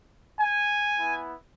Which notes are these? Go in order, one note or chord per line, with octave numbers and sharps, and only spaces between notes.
G#5
B3 E4